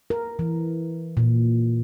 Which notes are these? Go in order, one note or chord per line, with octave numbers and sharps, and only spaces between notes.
A#4
E3
A#2